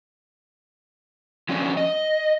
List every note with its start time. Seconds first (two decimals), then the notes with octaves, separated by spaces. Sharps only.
1.49 D3 F3 F#3 C#4 D4
1.77 D#5